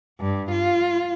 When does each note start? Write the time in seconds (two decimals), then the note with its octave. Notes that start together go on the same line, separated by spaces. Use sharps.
0.20 G2
0.52 F4